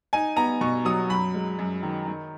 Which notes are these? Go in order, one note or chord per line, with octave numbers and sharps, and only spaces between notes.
D#4 G#5
B3 A#5
B2 C#6
F#3 D#6
F#2 B5
G#3
F#2
D#3
D#3